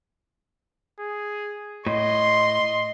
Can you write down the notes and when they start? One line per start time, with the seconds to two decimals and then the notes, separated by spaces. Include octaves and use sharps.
1.00 G#4
1.87 A2 D#5 C6